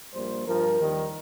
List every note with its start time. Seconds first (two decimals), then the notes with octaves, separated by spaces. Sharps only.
0.13 A#1 A#2 G3 C5
0.45 G2 F3 A#4
0.78 D#2 D#3 G3